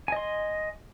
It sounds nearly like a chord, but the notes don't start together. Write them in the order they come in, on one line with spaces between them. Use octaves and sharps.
G#5 D#5 C6